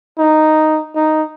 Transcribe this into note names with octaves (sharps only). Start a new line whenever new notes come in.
D#4
D#4